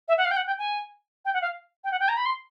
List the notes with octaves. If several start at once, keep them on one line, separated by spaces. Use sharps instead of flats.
E5
F#5
F5
G5
F#5
G5
G#5
G5
F#5
F5
G5
F#5
G5
A#5
B5
C6